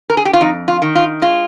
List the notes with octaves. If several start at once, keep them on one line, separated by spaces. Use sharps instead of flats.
A#4
G#4
G4
F4
F2 D#4
F4
D#3
F4
G#3 F4